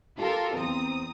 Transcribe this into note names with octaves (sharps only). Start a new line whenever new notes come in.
F4 G4 A4 A#4
E2 C4 A#5 D#6